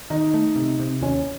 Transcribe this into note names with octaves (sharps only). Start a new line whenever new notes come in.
D#3 D#4
A3
C3
C3
D#2 C#4